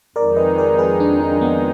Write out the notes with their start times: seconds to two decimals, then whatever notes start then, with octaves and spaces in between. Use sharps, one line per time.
0.16 F2 D#3 G#3 D#4 A#4 D5
0.36 B4 D#5
0.58 A#4 D5
0.78 G#4 B4
1.00 D4
1.21 D4
1.41 B3